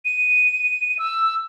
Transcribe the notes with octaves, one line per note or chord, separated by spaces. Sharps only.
D#7
E6